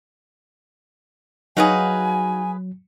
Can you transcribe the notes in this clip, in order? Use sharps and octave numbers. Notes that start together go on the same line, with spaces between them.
F#3 D#4 F#4 G#4 B4 F5 G#5